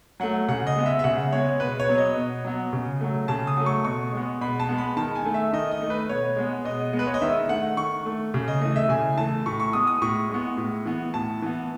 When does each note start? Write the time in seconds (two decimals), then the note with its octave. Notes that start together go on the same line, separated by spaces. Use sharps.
0.20 F#3 A3 F#5
0.48 C#3 F#5
0.67 D#5
0.76 G#3 B3
0.86 E5
0.99 E5
1.04 C#3 F#5
1.33 G#3 B3 C#5
1.60 B2 B4
1.80 C#5
1.89 F#3 B3
1.98 D#5
2.17 B2
2.45 F#3 B3
2.73 C#3
3.01 F#3 A3
3.28 C#3 A5
3.47 D#6
3.57 F#3 A3
3.66 C#6
3.85 B2 C#6
4.13 G#3 B3
4.41 B2 B5
4.60 A5
4.69 G#3 B3
4.78 B5
4.97 D#3 A5
5.16 G#5
5.25 A3
5.34 E5
5.53 D#3 D#5
5.71 D#5
5.82 A3
5.90 B4
6.09 B2 C#5
6.37 G#3 B3
6.65 B2 D#5
6.93 G#3 B3
6.99 B4
7.07 C#5
7.14 D#5
7.21 D#3 E5
7.49 A3 F#5
7.77 D#3 C#6
8.06 A3
8.34 C#3
8.48 D#5
8.61 E3 A3 D#5
8.76 E5
8.89 C#3 G#5
9.18 E3 A3 A5
9.46 A2 C#6
9.60 C#6
9.73 G#3 B3 D#6
9.87 D#6
10.02 A2 C#6
10.30 G#3 B3
10.57 A2
10.85 E3 B3
11.14 A2 A5
11.42 E3 B3